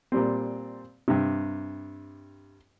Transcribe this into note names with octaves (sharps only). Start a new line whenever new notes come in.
A#2 G3 C4
G2 C3